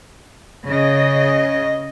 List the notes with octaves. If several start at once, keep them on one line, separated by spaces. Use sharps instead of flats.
C#3 D#5